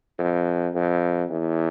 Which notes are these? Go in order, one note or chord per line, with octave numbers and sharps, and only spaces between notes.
F2
F2
E2